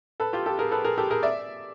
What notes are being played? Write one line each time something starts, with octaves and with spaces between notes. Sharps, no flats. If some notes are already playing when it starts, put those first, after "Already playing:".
A4 B4
F4 G4
G4 A4
G#4 A#4
A4 B4
G#4 A#4
G4 A4
G#4 A#4
D5 E5